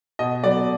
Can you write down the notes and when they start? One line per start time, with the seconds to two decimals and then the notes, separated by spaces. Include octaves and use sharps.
0.19 B2 D#5
0.44 F#3 B3 D5